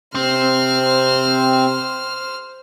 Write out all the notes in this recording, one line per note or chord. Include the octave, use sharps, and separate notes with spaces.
C3 C4 C5 F6